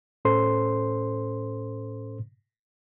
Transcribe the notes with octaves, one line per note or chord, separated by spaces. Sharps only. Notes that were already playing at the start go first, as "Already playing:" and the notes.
A2 C#4 A4 C5 C6